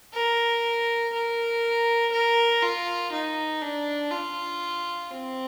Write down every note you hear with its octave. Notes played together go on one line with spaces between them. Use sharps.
A#4
A#4
A#4
F4
D#4
D4
F4
C4